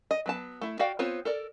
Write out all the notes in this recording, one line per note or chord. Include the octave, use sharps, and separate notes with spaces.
D#5
F#3 B3 A5
A3 E4
F#4 D5 F5 G5
B3 C4 F4 C5 C#5
A4 A#4 D5